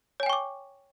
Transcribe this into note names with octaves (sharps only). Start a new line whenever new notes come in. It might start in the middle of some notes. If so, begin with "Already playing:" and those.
C#5 G5 G#5 C#6 D6